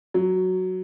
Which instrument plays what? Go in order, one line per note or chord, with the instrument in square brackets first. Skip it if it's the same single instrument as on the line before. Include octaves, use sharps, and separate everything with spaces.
[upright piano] F#3